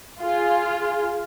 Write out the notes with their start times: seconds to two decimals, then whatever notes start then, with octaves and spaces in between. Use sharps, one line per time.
0.20 F4 G#4